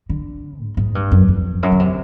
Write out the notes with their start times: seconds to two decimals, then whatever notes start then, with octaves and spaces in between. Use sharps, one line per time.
0.09 D3
0.60 G#2
0.77 G#2
0.95 G2
1.12 F#2
1.28 F2
1.63 F#2
1.72 C#3
1.80 C3